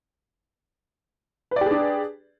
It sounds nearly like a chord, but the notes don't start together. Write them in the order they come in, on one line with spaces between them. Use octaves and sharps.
B4 D5 G4 G#4 D4